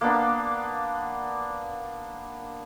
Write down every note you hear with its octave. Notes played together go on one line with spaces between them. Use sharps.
A#3 B3 D4